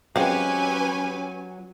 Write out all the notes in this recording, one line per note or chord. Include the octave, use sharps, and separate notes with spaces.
F#3 G#3 C4 C#4 G4 B4 F5 G#5